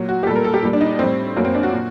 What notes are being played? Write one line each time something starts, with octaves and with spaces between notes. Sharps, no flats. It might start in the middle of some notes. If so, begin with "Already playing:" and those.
Already playing: A#2 F#3
F#4
G4
A#2 G3 A4
A#4
A4
G4
A#2 G3
D4
D#4
A2 G3 C4
F#2 F#3 A#3
C4
D4
F#4
A#2